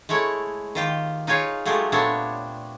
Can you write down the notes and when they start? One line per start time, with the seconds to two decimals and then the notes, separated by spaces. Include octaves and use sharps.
0.09 G#3 A3 E4 C#5
0.75 D#3 F4 G4
1.27 D#4 F4 G#4 C#5 F5
1.65 F#3 G#3 A3 F4 G4
1.92 A#2 A3 B3 C4 D4 C#5